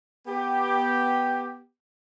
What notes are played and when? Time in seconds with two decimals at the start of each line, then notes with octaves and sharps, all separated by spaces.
0.27 B3 G4